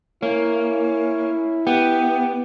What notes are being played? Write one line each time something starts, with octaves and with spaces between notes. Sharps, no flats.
A#3 C#4 E4
B3 G4